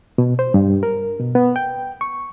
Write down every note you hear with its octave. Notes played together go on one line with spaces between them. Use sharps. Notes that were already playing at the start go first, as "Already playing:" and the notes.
B2
C5
G2
A#4
B2
B3
G5
C#6